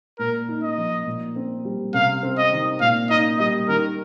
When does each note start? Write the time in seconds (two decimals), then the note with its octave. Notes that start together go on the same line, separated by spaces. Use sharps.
0.19 A#2 A#4
0.49 D#4
0.63 D#5
0.78 F3
1.06 A#2
1.36 C4
1.65 G3
1.94 C3 F5
2.23 C4
2.38 D#5
2.52 D#3
2.81 A#2 F5
3.10 D#4 D#5
3.39 G3 D#5
3.69 D#3 A#4